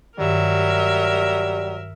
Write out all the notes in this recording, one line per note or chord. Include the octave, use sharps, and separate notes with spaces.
G2 D#3 F#3 G3 A#4 E5